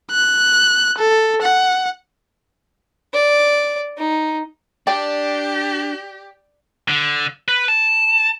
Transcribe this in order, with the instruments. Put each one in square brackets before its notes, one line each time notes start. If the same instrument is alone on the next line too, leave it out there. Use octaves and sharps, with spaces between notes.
[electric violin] F#6
A4
F#5
[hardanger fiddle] D5
D#4
[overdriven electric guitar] D4 [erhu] G4 [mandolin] D5 [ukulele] G5
[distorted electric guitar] D3
B4
A5